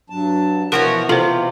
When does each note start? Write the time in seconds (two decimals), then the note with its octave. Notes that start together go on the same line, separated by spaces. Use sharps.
0.10 G2 F#3 A5
0.72 B2 E3 F3 E4 F#4 A#4 C#5 F#5
1.09 C3 F4 A4 C5